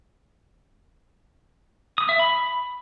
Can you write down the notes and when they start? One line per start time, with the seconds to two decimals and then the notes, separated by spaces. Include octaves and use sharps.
1.98 D#6
2.09 E5
2.20 B5